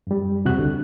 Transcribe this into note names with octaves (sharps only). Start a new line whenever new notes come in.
F#2 G3
E2 C3 F#4 F#6
C2 D3